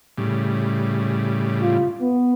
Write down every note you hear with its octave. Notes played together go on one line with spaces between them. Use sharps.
A2 C#3 G3
F4
B3